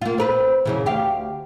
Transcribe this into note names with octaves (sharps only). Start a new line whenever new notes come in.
A#3 F4
C4 A#4 B4
F#2 C#3 E3
D2 G4 F5